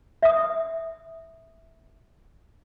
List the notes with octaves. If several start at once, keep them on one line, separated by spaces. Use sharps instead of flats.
E5 D#6